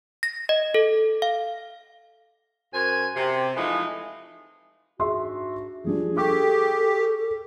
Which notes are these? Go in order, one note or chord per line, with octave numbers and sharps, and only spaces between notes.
A#6
D#5
A4
F5
F#2 C5 G#5
C3
E3 F3 G#3 A3 D#4
G#2 D4 F#4 G#4 E5 C6
F3 G3 D4 G#4
G4 A4 C#6 D6